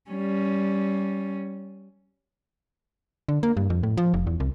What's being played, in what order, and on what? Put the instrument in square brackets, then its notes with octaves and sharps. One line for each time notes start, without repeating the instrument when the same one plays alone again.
[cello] G3 C#4
[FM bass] D3
A#3
G2
F2
A2
F3
F1
E2
C2